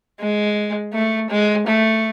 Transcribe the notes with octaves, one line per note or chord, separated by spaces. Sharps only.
G#3
A3
G#3
A3